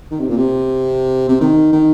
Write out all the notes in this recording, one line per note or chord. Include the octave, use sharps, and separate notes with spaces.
D#3
C3
A#2
C3
C3
D#3
D#3